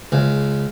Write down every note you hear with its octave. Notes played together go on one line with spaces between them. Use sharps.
C#2